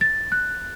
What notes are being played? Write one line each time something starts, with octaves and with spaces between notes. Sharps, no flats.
A6
F#6